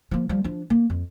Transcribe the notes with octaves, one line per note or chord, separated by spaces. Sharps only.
F3 A#3
F3 G3
F3 D4
A#3
F2